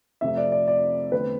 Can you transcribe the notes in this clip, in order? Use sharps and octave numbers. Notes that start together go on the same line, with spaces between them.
F2 C3 F3 A3 E5
D5
D5
D5
E2 D3 A3 C4 B4